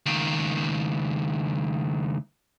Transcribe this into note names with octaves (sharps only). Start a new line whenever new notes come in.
C#2 D#3